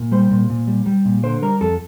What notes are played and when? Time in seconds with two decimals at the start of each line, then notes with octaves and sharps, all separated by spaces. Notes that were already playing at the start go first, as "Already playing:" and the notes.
Already playing: A#2
0.12 G3 C5
0.31 A#2
0.50 A#2
0.67 G3
0.86 G3
1.05 A#2
1.23 D3 C5
1.42 G3 A#4
1.61 F2 A4